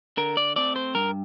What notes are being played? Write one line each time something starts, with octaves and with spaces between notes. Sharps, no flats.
D3 A#4
D5
A3 C4 D5
C5
G2 A#4